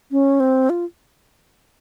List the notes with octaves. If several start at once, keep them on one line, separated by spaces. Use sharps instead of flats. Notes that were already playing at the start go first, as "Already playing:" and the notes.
C#4
C4
F4